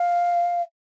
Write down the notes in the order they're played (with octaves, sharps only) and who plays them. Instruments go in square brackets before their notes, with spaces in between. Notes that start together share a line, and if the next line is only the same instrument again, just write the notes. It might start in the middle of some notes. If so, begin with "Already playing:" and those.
Already playing: [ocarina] F5